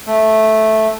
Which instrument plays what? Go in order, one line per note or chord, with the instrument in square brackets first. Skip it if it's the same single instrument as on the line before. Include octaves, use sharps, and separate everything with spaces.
[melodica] A3